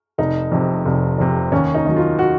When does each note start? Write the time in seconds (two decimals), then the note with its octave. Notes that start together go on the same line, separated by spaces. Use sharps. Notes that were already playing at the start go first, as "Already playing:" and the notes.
0.18 F1 D#4
0.52 F2 C3
0.85 F1
1.18 F2 C3
1.52 D#2 C#4
1.75 D#4
1.85 D#3 F#3
1.96 F4
2.19 F#4